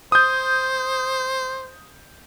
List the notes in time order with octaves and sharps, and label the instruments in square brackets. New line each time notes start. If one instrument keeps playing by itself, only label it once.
[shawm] C5 [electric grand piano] D#6 G6